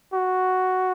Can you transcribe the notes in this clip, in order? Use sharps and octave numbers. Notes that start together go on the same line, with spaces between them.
F#4